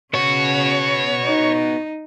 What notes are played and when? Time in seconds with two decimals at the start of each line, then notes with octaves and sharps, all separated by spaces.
0.14 C#3 B3 F#4 C#5
1.25 D#4